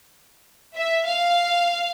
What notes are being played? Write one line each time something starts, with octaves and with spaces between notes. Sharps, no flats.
E5
F5